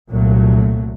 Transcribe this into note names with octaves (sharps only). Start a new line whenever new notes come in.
C2 A#2 F#3 A3